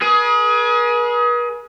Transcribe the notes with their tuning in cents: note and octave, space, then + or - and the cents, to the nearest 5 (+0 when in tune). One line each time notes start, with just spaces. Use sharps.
G#4 +20 B4 -45